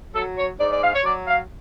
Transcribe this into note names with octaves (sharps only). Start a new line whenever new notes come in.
F#3 A4
C#5
G#2 D5
D5
F5
C#5
F#3 D5
F5